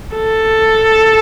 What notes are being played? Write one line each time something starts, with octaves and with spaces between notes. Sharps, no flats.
A4